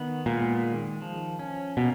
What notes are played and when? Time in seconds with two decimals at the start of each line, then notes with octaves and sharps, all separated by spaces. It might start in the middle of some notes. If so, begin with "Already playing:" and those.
Already playing: D#3 B3
0.26 A#2 G#3
0.63 D#3
1.02 F3
1.39 C#4
1.77 B2 A#3